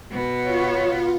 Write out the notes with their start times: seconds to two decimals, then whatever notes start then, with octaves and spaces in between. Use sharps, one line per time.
0.12 B2 B3
0.44 F4 C#5